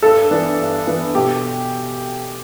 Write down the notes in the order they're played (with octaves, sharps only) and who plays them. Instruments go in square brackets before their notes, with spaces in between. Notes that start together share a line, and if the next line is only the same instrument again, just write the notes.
[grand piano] G2 A4
E3 B3 D4
G2
E3 B3 D4
B2 G4